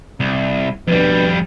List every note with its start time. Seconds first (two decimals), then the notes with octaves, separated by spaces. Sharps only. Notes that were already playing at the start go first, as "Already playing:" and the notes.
0.20 C2
0.88 F2 B2 G3 D4 B4